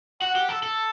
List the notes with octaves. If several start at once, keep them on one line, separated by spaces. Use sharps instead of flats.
F#4 F#5
G4
A4
A4